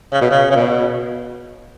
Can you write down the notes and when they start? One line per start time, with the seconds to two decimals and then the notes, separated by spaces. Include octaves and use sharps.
0.13 C#3
0.21 B2
0.31 C#3
0.51 C#3
0.56 B2